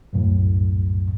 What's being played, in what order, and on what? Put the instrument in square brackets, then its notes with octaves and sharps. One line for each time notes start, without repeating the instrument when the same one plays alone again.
[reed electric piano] C2 F#2 A2